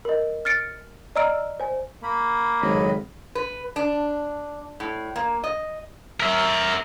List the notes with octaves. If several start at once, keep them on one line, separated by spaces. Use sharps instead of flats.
A#4 D#5
F6 A6 C#7 D7
D5 D#5 A#5 E6 F6 D7
C5 G#5
A#3 B5
G#1 F2 C#3 F#3 D#5 B5
B4
D4
A2
A#3
D#5
A#4 E5